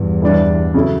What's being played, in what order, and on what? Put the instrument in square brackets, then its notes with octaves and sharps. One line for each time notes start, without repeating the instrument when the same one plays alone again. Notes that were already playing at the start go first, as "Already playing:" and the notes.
Already playing: [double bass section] E2 G2
[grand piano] E3 G3 D4
C#3 F#3 C#4 E4 A4